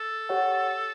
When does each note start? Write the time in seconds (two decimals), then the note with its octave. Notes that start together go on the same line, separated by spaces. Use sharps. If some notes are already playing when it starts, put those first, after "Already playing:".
Already playing: A4
0.29 G4 C#5 F#5